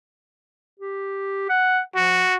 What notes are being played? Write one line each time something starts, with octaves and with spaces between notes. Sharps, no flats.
G4
F#5
F3 F#4